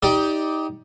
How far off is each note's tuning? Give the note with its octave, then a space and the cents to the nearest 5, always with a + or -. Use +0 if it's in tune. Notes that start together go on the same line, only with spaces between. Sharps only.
D#4 +20 G4 +0 D5 +0